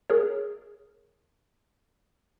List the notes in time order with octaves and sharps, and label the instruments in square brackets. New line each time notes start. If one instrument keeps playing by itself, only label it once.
[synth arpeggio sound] G#4 A#4 C#5